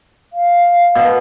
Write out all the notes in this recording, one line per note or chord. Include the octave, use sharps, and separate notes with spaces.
F5
B2